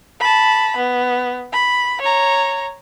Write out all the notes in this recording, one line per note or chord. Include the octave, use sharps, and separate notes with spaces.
A5 B5
B3
B5
C#5 A#5